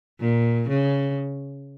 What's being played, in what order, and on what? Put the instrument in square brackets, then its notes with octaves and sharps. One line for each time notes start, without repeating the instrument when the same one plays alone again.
[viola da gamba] A#2
C#3